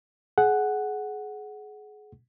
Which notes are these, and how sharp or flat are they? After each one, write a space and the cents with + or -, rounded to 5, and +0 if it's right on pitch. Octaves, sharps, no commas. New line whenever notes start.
G#4 +25 F#5 +0